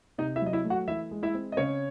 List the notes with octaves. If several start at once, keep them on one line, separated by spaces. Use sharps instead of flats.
C3 D#4 D#5
E4 E5
F#3 D#5
E4 E5
A3
F#4 F#5
E3 E4 E5
G#3
E4 E5
C4
D#5
C#3 C#4 C#5